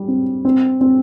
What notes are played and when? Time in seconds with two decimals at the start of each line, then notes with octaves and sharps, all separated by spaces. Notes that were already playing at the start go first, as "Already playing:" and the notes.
Already playing: G3
0.08 C4
0.45 C4
0.81 C4